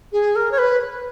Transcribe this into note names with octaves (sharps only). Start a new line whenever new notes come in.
G#4
A#4
C#5
B4